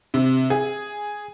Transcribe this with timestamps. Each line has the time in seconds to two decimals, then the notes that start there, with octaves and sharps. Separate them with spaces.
0.14 C3
0.50 G#4